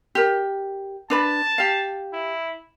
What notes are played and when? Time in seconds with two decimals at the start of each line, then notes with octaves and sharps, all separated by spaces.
0.15 G4 A#4
1.10 D4 B4 A5 B5
1.58 G4 F5
2.13 E4